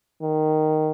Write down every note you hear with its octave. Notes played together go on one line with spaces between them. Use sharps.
D#3